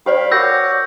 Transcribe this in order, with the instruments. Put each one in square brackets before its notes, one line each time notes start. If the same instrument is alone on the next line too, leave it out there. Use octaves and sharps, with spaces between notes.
[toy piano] G4 C5 D5 [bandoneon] F5 G5 B5
[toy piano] F#4 A#4 [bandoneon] C#5 F#5 D6 [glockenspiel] E6 G6 A#6